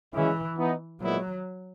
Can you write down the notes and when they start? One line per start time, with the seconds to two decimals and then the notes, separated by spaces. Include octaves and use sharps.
0.14 F#2 C#3 E3 G#3 C#4 E4
0.57 E3 B3 D#4
1.01 A#2 F#3 G#3 B3 E4